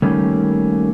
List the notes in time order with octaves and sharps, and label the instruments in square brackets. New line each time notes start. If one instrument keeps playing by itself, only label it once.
[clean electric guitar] D#3 G3 A3 A#3 C#4